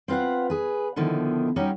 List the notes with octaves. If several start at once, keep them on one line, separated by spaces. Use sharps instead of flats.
C4 F4 B4 F5 F#5
G#4 B4
B2 D3 D#3 F3 E4
G3 C#4 D#4 F#4 G4